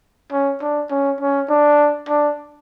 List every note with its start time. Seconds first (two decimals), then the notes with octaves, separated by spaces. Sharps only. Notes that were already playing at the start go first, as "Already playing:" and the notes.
0.32 C#4
0.61 D4
0.90 C#4
1.20 C#4
1.49 D4
2.09 D4